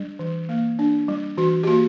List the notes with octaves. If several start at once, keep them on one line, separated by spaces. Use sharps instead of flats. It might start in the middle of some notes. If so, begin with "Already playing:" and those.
Already playing: G3 D4
E3
A#3
D4
G3
E3 F#4
G4
A#3 F#4